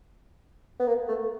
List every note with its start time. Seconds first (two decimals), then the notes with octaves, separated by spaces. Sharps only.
0.80 B3
0.87 A#3
1.08 A3